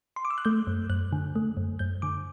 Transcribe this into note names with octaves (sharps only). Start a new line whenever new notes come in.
C6
D6
E6
F#6
A3 G6
F#2
F#2 F#6
D3
A3
F#2
F#2 G6
D3 D6